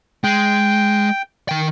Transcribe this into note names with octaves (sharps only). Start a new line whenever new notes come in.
G#3 G5
D#3 G5